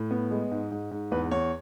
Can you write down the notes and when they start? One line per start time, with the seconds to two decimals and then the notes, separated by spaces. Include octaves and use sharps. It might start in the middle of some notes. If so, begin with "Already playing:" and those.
Already playing: A2
0.11 B3
0.31 G#3
0.51 G#2
0.71 G#2
0.91 G#2
1.12 E2 B4
1.31 E2 C#5